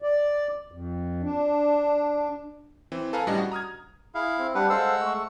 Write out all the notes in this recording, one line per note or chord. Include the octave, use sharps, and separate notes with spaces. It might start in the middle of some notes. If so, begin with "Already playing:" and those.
D5
F2
D4
E3 C4
A4 B4 F5 G#5 A#5
A2 G3 C#4 D4 D#5
F#4
A#5 D#6 F6 G#6
E4 G#4 F5
C4
G3 D4 G4 B4 F#5
G#3 A4 C5 F5 F#5 E6
A3 C#6